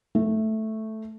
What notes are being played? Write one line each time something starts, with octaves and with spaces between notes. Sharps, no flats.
A3